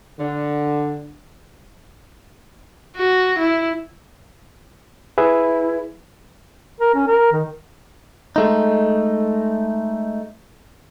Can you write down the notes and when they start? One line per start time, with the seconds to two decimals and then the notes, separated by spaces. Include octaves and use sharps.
0.19 D3
2.97 F#4
3.39 E4
5.18 E4 G#4 B4 E5
6.81 A#4
6.95 C#4
7.08 A#4
7.32 D#3
8.36 G#3 A3 D#4